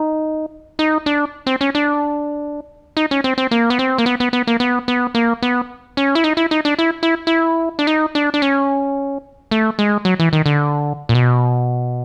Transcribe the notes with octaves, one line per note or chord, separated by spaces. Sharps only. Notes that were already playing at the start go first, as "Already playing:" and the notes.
Already playing: D#4
D#4
D4
C4
C#4
D4
D#4
C#4
C4
C4
A#3
B3
C4
A#3
B3
B3
B3
A#3
B3
B3
A#3
B3
C#4
E4
D#4
E4
D#4
D4
E4
E4
E4
D4
D#4
D4
D4
C#4
A3
G#3
F#3
E3
D#3
D3
A#2
B2